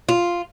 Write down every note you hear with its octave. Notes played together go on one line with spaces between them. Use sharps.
F4